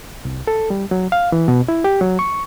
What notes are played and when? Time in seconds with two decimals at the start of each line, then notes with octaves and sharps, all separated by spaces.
0.25 C2
0.47 A4
0.70 G3
0.91 F#3
1.12 F5
1.32 E3
1.48 B2
1.68 E4
1.84 G4
2.01 F#3
2.19 C#6